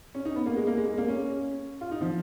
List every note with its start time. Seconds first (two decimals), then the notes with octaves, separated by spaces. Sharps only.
0.15 C#4
0.25 D#4
0.35 B3
0.46 A#3
0.56 G#3
0.67 A#3
0.77 G#3
0.87 G#3
0.98 A#3
1.08 C#4
1.81 F4
1.91 D#4
2.01 F3